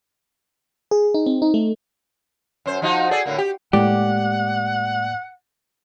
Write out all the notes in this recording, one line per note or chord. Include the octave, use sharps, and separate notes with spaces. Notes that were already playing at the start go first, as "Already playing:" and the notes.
G#4
D#4
C4
D#4
A3
F#2 C5
F3 D#4 F#4
G#4 A4 D5
A2 D3 A#3
G4
A2 G#3 A#3 G4 D5 F#5